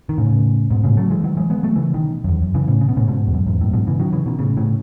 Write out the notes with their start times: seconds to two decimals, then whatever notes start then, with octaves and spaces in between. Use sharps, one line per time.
0.09 D#3
0.18 A2 C#3
0.70 G#2 B2
0.84 A2 C#3
0.97 F#3 A3
1.11 E3 G#3
1.24 D#3 F#3
1.37 E3 G#3
1.50 G#3 B3
1.63 F#3 A3
1.76 C#3 E3
1.94 B2 D#3
2.24 F#2
2.29 E2
2.42 F#2
2.54 C#3 E3
2.68 A2 C#3
2.81 C#3
2.89 B2
2.97 A2 C#3
3.08 G#2 B2
3.27 E2
3.34 F#2
3.47 E2 G#2
3.61 F#2 A2
3.74 G#2 B2
3.87 C#3 E3
4.00 D#3 F#3
4.13 C#3 E3
4.26 B2 D#3
4.39 A2 C#3
4.57 A2 C#3